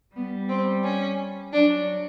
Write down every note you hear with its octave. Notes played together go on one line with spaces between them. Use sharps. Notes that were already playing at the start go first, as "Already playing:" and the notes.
G3 B3
C4
C#4
F#3 D4